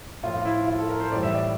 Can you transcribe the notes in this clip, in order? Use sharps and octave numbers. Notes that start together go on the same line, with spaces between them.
A2 F3 F4
E4
F4
A4
A#4
C5
A2 E3 G3 D5
E5
D5